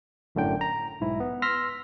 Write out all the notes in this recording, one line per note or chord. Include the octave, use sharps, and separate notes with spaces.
G1 F#2 A2 D3 D4 G5
A#5
B1 G#2 E4
B3
C6 E6 F6 A#6 B6